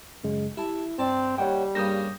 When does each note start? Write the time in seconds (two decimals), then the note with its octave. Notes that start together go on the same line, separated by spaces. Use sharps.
0.24 F#2 C#3 G#3
0.57 E4 G4 A5
0.99 G2 C4 D5 A5
1.38 D#2 G3 C#5 F#5 G5
1.75 G2 C#3 A#3 D#6 G6 A#6